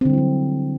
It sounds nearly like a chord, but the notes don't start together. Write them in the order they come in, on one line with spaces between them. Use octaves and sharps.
C4 D3 G3 E4 F#3